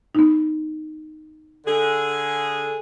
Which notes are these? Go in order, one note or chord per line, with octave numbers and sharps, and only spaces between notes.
B3 D#4
D3 G#4